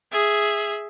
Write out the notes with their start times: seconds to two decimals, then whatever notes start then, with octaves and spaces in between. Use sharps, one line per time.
0.12 G#4 E5